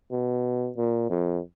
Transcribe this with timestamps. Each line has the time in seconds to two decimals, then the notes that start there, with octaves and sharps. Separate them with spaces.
0.11 B2
0.77 A#2
1.10 F2